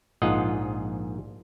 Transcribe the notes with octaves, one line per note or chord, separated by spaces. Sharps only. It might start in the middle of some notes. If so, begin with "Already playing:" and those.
A#1 G#2 F4 D#5 F#5